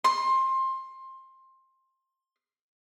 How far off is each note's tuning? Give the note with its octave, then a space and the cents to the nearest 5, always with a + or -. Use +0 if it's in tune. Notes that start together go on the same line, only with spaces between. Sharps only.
C6 +20